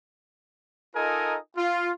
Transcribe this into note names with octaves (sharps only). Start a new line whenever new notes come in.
D#4 F4 A4 A#4 D#5 G#5
F4